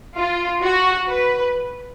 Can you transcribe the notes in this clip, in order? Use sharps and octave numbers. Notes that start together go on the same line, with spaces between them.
F4
F#4
B4